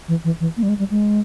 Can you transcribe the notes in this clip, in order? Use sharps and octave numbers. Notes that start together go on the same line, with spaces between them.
E3
E3
E3
A#3
G3
G#3
G3
G#3